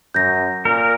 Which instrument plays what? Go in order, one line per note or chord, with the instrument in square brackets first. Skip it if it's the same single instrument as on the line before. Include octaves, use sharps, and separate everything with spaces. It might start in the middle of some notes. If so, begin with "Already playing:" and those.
[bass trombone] F#2 [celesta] G6 A#6
[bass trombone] A#2 [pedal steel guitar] A#4